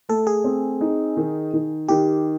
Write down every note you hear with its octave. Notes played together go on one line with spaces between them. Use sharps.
A3 A4
G#4
C4
D#4
D#3
D#3
D#3 G4